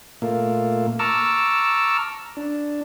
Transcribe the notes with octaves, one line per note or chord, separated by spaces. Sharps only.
A#2 A3 A#3
A5 A#5 C#6 D6 E6 F6
D4